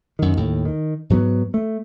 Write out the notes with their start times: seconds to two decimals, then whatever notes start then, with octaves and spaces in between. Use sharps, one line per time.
0.19 F#2 D#3
0.37 D#2 A2
0.65 D#3
1.10 G#2 F#3 B3
1.54 A3